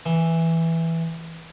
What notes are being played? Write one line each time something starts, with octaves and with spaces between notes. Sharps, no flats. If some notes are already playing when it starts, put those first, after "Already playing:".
E3